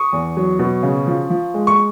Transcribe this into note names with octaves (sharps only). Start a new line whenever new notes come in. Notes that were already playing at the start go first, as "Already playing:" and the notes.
Already playing: C#6 D#6
E2
F#3
B2
C#3
F3
F3
G#3
C#6